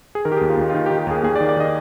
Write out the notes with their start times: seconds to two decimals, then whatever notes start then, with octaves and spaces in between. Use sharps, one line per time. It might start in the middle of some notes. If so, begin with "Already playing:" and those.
0.15 G#4
0.25 D#3 A#4
0.32 G4
0.37 D#2 G#4
0.49 F4
0.57 D#2 D#4
0.70 F4
0.74 D#3 D#4
0.86 G4
0.91 D#3
0.99 G4
1.07 D#2 G#4
1.23 D#2 G#4
1.36 D5
1.41 D#3
1.49 D5
1.57 D#3 D#5